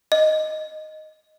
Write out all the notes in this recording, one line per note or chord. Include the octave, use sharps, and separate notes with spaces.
D#5